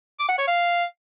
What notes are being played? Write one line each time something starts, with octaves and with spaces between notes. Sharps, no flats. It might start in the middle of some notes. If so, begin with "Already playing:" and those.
D6
F#5
C#5
F5